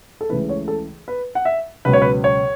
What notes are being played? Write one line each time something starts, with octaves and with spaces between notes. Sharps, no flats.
A4
C#2 C#3 E3 A3 B4
C#5
A4
B4
F#5
E5
C#2 B2 F#3 C#4 B4
C#5
B4
C#5